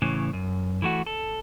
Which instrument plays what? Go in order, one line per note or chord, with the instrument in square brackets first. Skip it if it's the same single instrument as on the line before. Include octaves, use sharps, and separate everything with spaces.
[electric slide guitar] A2 C#3 E3
F#2
E3 A3 F#4
A4